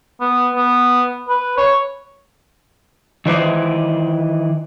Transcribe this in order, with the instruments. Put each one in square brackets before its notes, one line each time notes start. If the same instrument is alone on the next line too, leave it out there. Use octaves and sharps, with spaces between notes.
[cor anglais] B3
B3
B4
C#5
[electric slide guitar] D#3 E3 C5 D5